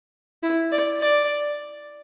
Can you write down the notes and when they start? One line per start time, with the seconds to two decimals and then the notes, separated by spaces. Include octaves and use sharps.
0.43 E4
0.72 D5
1.01 D5